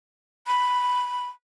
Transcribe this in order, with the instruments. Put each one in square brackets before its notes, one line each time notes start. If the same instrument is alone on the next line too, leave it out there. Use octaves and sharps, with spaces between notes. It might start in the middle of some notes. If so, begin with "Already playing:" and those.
[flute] B5